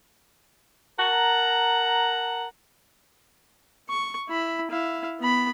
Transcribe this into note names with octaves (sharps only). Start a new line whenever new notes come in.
A#4 F#5 A5 A#5
C#6
E4 B5
E4 F5
B3 B5